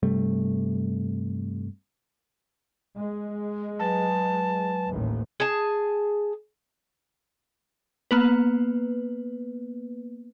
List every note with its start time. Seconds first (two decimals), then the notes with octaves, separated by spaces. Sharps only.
0.03 G2 C3 G3 A3
2.95 G#3
3.79 F#3 B4 G#5 A5
4.88 A1 D#2 A2
5.40 G#4 A5
8.11 A#3 B3 B4